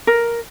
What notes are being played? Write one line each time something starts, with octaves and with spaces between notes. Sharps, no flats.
A#4